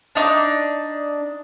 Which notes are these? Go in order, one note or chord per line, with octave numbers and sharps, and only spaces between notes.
D4 D#4 C#5 D5